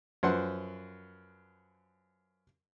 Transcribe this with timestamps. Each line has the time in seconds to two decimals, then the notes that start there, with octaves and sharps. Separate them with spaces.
0.23 F#2 F3 B4 C5 F#5 C6